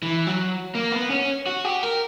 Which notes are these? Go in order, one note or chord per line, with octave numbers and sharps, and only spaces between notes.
E3
F#3
A#3
B3
C#4
F#4
G4
A#4